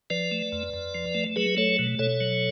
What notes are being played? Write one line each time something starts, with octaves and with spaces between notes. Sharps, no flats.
F3 B4 D5
A3
F2
F2
F3
A3
F#3 G#4 B4
A3 A4 C#5
B2
B2 A4 C#5
F#3